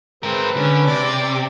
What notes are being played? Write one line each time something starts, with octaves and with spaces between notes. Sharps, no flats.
G#3 C4 A#4 B4
D3 C#4
C3 D5